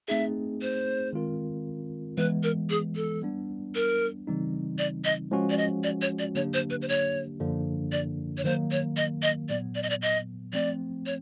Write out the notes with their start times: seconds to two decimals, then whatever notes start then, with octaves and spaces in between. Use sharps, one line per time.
0.08 A3 C4 D#4 G#4 E5
0.62 C5
1.13 D#3 G#3 C4 F4 A#4
2.18 E3 G#3 B3 B4
2.43 A#4
2.70 G#4
2.96 A4
3.22 G3 B3 D4
3.75 A#4
4.27 C#3 E3 G3 C4 D#4
4.78 D5
5.05 D#5
5.31 F3 G#3 C#4 F#4
5.50 D5
5.58 D#5
5.84 D5
6.02 C#5
6.19 D5
6.35 D3 F#3 A#3 D4 G4 C#5
6.54 C5
6.70 B4
6.82 C5
6.89 C#5
7.40 F#2 D3 F3 A#3 D4
7.92 D5
8.37 C#5
8.44 D#3 F#3 A#3 C5
8.71 C#5
8.97 D#5
9.22 D#5
9.49 A#2 F#3 B3 D5
9.75 D5
9.83 D#5
9.90 D5
10.02 D#5
10.53 F3 A3 C4 D5
11.06 C#5